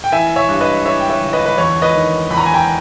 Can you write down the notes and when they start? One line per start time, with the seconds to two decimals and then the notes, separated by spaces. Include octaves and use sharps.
0.04 G5
0.12 E3 E5 G#5
0.36 C#5 E5
0.49 G2
0.61 B4 D#5
0.85 E3 C#5 E5
1.00 G5
1.10 C#5 E5
1.21 G1
1.33 B4 D#5
1.46 B4
1.58 E2 C#5
1.82 B4 D#5
1.94 D#3
2.30 E2 B5
2.38 A#5
2.46 G#5
2.54 G5 A#5